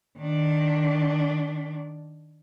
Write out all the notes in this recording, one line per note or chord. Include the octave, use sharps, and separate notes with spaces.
D#3 D4